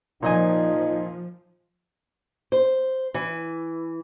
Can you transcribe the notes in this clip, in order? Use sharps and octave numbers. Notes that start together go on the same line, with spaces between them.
A#2 F3 D#4 D#5 G#5
C5
E3